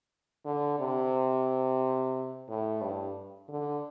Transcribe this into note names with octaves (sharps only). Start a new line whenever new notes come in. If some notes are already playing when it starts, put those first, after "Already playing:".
D3
C3
A2
G2
D3